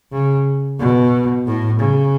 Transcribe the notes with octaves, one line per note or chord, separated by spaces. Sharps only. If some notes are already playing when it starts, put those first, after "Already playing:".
C#3
B2
A2
C#3